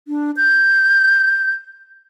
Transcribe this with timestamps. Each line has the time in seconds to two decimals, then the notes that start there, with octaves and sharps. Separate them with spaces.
0.08 D4
0.37 G6